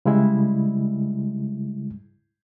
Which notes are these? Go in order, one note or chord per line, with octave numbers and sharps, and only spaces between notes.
C#3 G3 G#3 E4